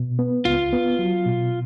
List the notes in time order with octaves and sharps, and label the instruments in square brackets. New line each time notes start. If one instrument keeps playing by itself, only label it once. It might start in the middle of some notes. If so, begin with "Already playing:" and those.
Already playing: [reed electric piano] B2
B3
[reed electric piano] C#2 [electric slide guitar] F4
[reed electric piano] B3
F#3
B2